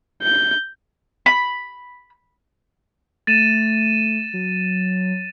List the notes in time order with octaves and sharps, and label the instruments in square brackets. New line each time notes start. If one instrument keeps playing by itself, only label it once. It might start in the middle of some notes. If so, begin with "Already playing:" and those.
[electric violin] G6
[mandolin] B5
[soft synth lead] A3 [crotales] A6 D#7 E7
[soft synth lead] F#3